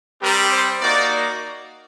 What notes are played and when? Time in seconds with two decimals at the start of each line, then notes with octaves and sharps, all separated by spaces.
0.21 G3 C4 G4 A#4
0.51 C5
0.80 A#3 D#4 F#4 D5